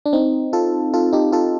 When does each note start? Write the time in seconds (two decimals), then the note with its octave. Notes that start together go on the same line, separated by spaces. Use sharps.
0.05 D4
0.13 C4 D#4
0.53 F4 A4
0.93 F4 A4
1.13 D#4 G4
1.32 F4 A4